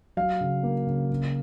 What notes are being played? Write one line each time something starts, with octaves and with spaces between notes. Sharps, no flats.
F#3 F5
C#3
A#3
C#3
C#3